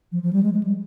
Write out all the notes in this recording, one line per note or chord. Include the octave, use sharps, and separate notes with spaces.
F3
F3
G3
G#3
G#3
G3